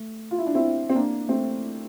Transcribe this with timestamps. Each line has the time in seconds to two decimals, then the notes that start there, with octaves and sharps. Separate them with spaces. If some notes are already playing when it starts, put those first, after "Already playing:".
Already playing: A3
0.31 F4
0.38 E4
0.47 D4
0.55 C4 E4
0.90 C4
0.95 A#3 D4
1.28 A3 C4